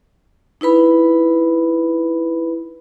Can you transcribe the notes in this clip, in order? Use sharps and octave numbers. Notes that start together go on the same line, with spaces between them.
D#4 E4 B4 B5